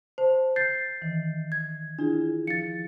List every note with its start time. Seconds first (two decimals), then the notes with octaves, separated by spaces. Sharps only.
0.18 C5 A5
0.56 G6 A6 C7
1.02 D#3 E3
1.52 G#6
1.99 D4 E4 F4 G#4
2.47 F3 A6 C#7